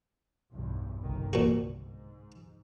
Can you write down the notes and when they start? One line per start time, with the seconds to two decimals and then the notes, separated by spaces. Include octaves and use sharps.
0.52 B1 E2 G2
1.00 G1 C2 D#3
1.33 C2 A#2 F#4
1.76 G#2